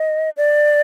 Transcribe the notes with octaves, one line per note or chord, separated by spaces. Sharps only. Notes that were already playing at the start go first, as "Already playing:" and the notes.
Already playing: D#5
D5